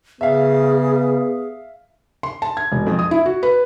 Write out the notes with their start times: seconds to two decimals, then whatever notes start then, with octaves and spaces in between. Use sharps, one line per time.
0.21 C#3 B3 G#4 E5 F5
2.23 C6
2.42 A5
2.57 G#6
2.72 E1
2.86 F2
2.99 D#6
3.11 E4
3.26 F#4
3.43 B4